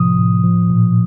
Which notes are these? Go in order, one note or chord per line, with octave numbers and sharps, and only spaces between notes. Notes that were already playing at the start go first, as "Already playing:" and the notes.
Already playing: A2 C3 F3 D#6
A2
F3
A#2